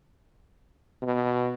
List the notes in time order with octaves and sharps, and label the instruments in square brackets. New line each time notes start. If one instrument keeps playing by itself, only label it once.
[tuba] B2